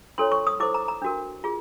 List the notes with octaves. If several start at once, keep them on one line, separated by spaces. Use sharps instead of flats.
D4 F4 A4 C#5 C6
C#6
D#6
E4 A4 C5 D6
A#5
A#5
D4 F#4 A#4
F4 G#4